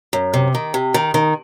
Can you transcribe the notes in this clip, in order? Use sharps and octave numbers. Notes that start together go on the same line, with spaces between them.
F#2
C3
D#3
C3
D#3
D#3